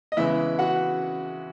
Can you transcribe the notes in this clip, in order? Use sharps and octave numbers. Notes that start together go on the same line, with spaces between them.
D#5
E2 C#3 E3 G#3 E4 E5
F#4 F#5